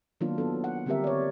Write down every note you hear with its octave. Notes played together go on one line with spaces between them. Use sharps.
D#3 F#3 A#3 B3 D4 F4
B3 A4
F#5
D3 G3 C4 G4 A#4 E5
C#5 D5